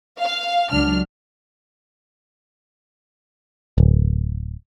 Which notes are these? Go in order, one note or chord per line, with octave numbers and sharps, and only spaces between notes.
F5
C#2 F#3 D4 F6
D1